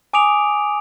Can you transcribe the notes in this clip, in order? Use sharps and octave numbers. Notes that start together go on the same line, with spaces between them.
G#5 D6 D#6 D7 F7